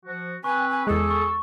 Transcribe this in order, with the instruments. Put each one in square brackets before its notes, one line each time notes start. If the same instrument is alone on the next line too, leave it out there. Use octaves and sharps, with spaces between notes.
[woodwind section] F3 F#4
[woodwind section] C4 B4 [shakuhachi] G#5 [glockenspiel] C#6
[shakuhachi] G#5
[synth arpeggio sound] E2 G#3 [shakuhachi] G#4 [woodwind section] A4
[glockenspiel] C#6